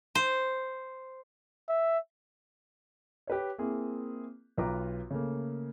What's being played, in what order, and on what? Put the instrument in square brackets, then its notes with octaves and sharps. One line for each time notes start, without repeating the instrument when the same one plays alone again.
[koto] C5
[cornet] E5
[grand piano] G4 B4 C#5
A#3 C4 E4 G#4
B1 F4 B4 G5 A#5 D6
C#3 A3 A#3